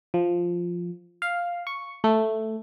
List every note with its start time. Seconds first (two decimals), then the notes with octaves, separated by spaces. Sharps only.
0.14 F3
1.22 F5
1.67 C#6
2.04 A3